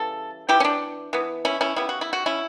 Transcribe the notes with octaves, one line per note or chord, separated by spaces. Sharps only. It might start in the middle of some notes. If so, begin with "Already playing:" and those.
Already playing: C#3 E3 G3 A4
E3 B3 E4 G4
C#4
D4
E3 B3
C#4 E4
C#4 E4
C#3 G3 B3 E4
F#4
E4
F#4
C#4 E4